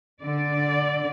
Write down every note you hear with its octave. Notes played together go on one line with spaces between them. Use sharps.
D3 D5